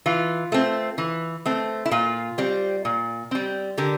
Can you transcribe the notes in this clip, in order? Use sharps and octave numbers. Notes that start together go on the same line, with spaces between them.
E3 F4
A3 C4
E3
A3 C4
E4
A#2 F4
G3 C4
A#2
G3 C4
D3 G4 A#4